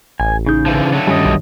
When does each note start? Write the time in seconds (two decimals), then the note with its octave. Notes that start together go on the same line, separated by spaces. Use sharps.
0.20 A1 G#5
0.46 C#3 D#4 G#4 D#6 G6
0.66 D3 E3 F3
0.92 D3 F#3 A3
1.07 G2 D#3 G3 C#4 D#5
1.25 B1